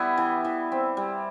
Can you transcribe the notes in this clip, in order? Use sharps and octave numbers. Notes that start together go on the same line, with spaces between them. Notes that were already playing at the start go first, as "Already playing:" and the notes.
Already playing: G3 B3 E4
E3
E3
C4
G3